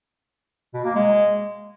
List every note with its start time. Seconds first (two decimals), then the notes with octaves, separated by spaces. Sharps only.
0.74 B2
0.84 A#3
0.95 G#3